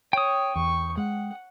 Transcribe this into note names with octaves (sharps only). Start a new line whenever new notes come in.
C#5 G5 D#6
E2 C#6
G#3 F#5